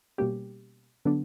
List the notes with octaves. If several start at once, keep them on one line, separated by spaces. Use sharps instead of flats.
B2 G3 A#3 C#4 G4
D3 F#3 B3 D4